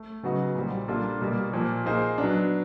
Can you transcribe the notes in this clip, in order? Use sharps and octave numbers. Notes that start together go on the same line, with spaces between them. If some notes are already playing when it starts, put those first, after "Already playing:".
Already playing: A3
C#3 F#3 B3 D#4 F#4
A#2 G3 C4
G3 A#3 D4 F4 A4
B2 G3 A#3
A#2 F3 A#3
A#3 D#4 G#4 C5
F#3 B3 D4